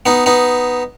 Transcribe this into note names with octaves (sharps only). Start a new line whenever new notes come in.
B3 D#4
B3 D#4